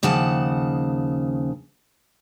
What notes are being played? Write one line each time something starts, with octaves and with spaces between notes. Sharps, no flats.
D#2 C#3 F3 F#5 A5